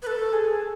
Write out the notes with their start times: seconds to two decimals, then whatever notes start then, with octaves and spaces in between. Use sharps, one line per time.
0.02 B4
0.07 A4
0.33 G#4